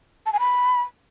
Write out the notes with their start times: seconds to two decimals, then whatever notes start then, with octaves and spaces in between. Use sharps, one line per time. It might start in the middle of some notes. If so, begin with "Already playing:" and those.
0.26 A5
0.33 G#5
0.40 B5